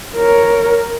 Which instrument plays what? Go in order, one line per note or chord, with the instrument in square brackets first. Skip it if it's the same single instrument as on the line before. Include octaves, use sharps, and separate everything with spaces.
[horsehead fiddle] A#4 C#5